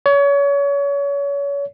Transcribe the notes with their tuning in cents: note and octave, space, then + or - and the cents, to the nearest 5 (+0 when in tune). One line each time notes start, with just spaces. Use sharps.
C#5 +30